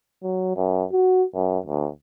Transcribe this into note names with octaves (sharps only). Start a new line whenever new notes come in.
F#3
F#2
F#4
F#2
D2